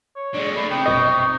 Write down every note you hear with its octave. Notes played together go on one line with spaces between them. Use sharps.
C#5
D3 G#3 D5
A3 A#3 B5
C3 D#4 G5
G1 B2 D#5 C#6